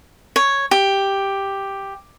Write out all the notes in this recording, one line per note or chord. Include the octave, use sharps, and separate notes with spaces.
C#5
G4